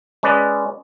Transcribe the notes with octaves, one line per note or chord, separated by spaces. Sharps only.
G#3 C#4 B4 D5 D#5